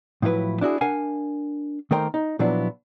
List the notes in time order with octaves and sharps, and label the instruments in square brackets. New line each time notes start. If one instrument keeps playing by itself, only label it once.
[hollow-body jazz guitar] A2 F3 F#3 E4 B4
D4 E4 F#4 G#4
D4 A#4 F5 F#5 G#5
D#3 A3 A#3 A#4 C5 G5
D#4
A#2 F3 F#3 B3 D4 E4